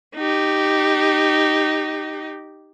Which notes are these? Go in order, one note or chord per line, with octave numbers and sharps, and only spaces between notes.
D#4 G4